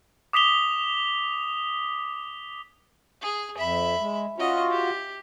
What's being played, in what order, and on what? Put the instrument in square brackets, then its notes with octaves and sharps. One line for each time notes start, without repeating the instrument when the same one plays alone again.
[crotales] D6 D#6 B6 F7 G7
[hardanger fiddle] G#4
[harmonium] F2 [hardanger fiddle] E5 B5
[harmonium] G#3
[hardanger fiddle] C#4 D#5 [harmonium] F4 F#4
[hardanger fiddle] G4